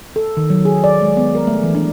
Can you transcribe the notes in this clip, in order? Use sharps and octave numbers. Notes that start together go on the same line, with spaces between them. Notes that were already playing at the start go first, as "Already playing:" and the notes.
A4
D#3
F#3
G#4
D5
G#3
B3
A#4
A3
E3
D4